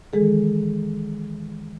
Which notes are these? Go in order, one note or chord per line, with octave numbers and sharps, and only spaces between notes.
D#3 E3 G#3 G#4 A4